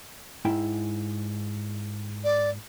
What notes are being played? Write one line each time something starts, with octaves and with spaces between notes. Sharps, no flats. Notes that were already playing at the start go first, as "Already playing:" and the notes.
G#2 E4 G5
D5